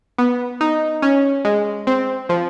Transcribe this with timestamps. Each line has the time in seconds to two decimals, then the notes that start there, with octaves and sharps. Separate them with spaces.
0.18 B3
0.61 D#4
1.02 C#4
1.45 G#3
1.87 C4
2.29 F3